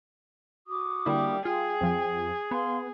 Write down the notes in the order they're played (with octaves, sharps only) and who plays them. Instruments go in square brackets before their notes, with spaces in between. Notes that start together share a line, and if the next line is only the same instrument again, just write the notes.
[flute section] F#4 D6 D#6
[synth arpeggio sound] D3 A#3 E4 [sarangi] G3
[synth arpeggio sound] F4 [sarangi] G#4 [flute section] G5
[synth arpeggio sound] F2 F3
[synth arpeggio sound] B3 [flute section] F5 C6